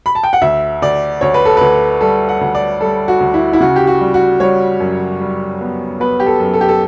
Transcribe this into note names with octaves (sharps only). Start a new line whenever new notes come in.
B5
A5
G5
F#5
D2 E5
D2 D5
D2 C#5
B4
A4
D2 B4
G3 A4
F#5
D2
D5
G3 A4
F#4
D2
E4
E4
C#3 F#4
G4
F#4
G3
F#4
G3 C#5
F#2
G3
B3
B3 B4
G4
A4
F#2
A4
G4
A4